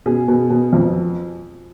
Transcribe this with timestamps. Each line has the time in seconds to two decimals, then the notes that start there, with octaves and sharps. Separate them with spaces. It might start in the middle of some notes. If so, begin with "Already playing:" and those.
0.06 B2 G#4
0.28 B2
0.50 B2
0.73 F2